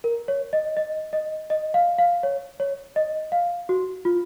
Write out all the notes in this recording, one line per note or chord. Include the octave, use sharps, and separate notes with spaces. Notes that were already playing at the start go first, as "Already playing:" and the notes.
A#4
C#5
D#5
D#5
D#5
D#5
F5
F5
C#5
C#5
D#5
F5
F#4
F4